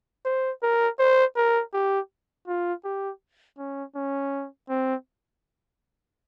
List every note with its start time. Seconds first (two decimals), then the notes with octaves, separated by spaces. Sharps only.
0.25 C5
0.63 A#4
0.99 C5
1.37 A#4
1.74 G4
2.48 F4
2.85 G4
3.58 C#4
3.96 C#4
4.69 C4